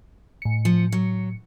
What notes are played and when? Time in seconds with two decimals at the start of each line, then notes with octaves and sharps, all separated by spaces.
0.42 A2 C#7
0.65 F3
0.92 F#3